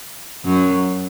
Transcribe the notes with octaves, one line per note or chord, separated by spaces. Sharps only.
F#2 F#3